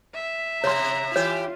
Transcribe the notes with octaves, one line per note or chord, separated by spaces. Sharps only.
E5
C3 C#5 A#5 C6
E3 F4 G4 C#5